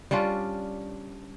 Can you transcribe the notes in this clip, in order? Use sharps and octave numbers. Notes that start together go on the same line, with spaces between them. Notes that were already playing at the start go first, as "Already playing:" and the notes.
G3 C#4 D4 F4